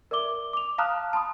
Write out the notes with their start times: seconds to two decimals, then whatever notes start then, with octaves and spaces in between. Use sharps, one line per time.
0.11 A#4 D5 E5 D6 G7
0.53 D6 F7
0.78 F5 A5 A#5 D#6 F6 F#6
1.13 A5 B5 C6 D#6